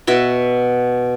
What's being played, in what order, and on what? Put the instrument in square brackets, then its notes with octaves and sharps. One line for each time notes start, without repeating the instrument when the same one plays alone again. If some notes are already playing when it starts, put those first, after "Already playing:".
[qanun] B2 F#4 E5